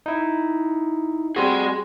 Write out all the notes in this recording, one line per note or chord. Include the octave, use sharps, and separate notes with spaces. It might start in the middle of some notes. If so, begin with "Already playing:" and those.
D#4 E4
G3 C4 F#4 G#4 C6